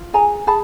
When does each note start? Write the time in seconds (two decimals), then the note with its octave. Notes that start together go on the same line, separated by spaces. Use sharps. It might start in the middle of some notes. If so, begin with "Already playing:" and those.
Already playing: F4
0.13 G#4 G#5 A#5
0.47 G#4 A5 B5